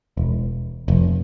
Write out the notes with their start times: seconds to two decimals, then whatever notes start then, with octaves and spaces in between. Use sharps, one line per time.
0.17 E1
0.88 F1